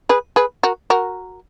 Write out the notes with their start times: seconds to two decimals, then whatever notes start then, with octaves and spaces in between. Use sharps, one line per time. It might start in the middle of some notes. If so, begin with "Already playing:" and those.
0.09 G#4 B4
0.36 G#4 B4
0.63 F#4 A#4
0.90 F#4 A#4